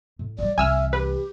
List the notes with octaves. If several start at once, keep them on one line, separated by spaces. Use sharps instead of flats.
A2
F3 G3 D5
C2 E3 E5 G#5 E6 F6
G4 B4